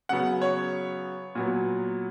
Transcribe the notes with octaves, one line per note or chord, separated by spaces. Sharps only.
C#3 F#3 B3 F#5
C#5
A#2 F#3 B3